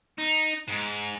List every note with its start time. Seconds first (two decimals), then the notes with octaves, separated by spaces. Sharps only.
0.18 D#4
0.68 G#2